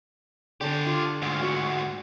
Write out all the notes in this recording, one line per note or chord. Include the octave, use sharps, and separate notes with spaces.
D3 D4 G4 A4
F4
D2 G#2 F5
F#4 F#5